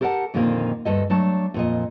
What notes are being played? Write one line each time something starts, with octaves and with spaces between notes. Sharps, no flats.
G4 A4 A#4 C5 F#5 A5
F2 A#2 D3 D#3 A#3 C4
D2 G2 A4 D#5
F#3 A3 D4 A5
F2 A#2 D#5